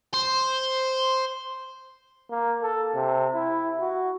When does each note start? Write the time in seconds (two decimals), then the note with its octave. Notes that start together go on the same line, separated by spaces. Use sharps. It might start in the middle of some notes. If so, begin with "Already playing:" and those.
0.14 C5
2.31 A#3
2.63 A4
2.95 C3
3.34 E4
3.80 F#4